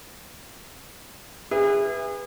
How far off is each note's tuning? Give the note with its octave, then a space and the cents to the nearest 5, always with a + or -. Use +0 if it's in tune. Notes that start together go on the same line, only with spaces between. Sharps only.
G#4 -40 B4 -5 E5 +0